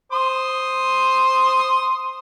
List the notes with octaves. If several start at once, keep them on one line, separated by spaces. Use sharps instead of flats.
C5 C6 D#6